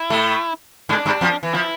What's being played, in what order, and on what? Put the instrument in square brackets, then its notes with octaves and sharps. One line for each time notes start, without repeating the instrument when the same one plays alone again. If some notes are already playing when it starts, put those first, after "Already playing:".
Already playing: [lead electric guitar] E4
[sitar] A2 A3
[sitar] G#2 G#3 [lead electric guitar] D4
[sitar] G2 G3
F2 F3
E3
[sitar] F3 [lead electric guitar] E4